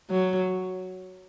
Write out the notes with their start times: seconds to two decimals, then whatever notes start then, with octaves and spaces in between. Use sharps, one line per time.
0.10 F#3